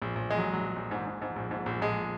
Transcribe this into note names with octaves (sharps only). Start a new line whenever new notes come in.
A#1
A#1
A#1 G#3
F#3
A#1
F#3
A#1
A#1
G#2
G#2
G#2
A#1
G#2
A#1
A#1 G#3